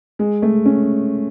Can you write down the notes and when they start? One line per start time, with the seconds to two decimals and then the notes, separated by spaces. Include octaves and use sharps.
0.19 G#3
0.42 A3
0.65 C#4